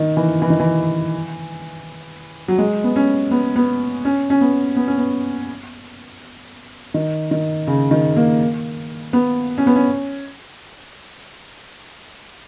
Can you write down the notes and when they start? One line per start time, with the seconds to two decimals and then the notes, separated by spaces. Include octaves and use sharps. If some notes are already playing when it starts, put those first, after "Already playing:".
Already playing: D#3
0.17 E3
0.42 E3
0.50 D#3
0.60 E3
2.48 F#3
2.58 G#3
2.84 B3
2.96 C#4
3.31 B3
3.56 B3
4.05 C#4
4.30 C#4
4.41 B3
4.76 B3
4.87 C#4
4.98 B3
6.94 D#3
7.31 D#3
7.67 C#3
7.91 D#3
8.16 A#3
9.13 B3
9.58 C#4
9.67 B3
9.76 C#4